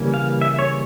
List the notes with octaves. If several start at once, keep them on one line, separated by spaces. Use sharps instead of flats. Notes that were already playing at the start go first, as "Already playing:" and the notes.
Already playing: C#3 E3 G3 A#3 C#4
F5
E5
C#5